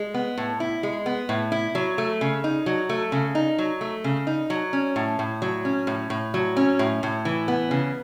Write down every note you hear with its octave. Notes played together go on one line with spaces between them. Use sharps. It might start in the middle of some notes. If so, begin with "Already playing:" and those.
Already playing: G#3
B3
A2
E4
G#3
B3
A2
E4
F#3
A3
C#3
D#4
F#3
A3
C#3
D#4
F#3
A3
C#3
D#4
F#3
C#4
A2
A2
F#3
C#4
A2
A2
F#3
C#4
A2
A2
E3
B3
C#3